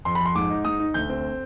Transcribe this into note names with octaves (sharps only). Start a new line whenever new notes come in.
F2 C6
B5
F2
C6
G#2 D6
D#4
G#2 D#6
D#4
D2 G6
C4